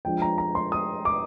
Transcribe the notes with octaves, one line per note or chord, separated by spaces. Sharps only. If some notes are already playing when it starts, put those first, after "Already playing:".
F3 G#3 D4 G5
A#5
A#5
C6
D#6
D6